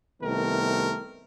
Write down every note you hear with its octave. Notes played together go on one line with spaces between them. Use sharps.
C2 D#3 A3 B3 A#4